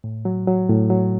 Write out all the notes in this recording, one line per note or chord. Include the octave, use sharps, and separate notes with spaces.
A2
F#3
F#3
A2
F#3